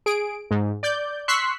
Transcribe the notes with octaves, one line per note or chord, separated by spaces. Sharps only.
G#4 D7
G#2
D5 G6
C6 C#6 E6 F#6 B6 C7